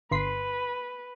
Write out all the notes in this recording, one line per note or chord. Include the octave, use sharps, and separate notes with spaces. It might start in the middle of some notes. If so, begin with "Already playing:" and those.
G1 B4 C6 B6